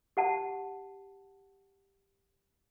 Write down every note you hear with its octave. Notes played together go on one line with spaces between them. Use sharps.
G4 F#5 A5